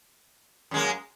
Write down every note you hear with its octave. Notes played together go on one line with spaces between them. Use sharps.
F#2 G#3 A#3